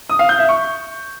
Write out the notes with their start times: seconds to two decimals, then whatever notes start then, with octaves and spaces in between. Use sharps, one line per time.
0.09 D#6
0.19 F5
0.29 G6
0.39 E5
0.49 C#6